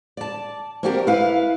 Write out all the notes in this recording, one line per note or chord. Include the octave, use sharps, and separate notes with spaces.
D5 A5
A#3 C4 D4 F#4 G4 A#4
E4 B4 F5